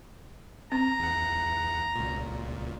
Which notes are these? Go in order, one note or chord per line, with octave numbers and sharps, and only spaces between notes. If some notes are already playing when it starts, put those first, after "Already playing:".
C4 A#5
E2 F#5
C#2 A#2